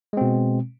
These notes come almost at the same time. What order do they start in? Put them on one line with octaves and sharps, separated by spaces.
G#3 C4 B2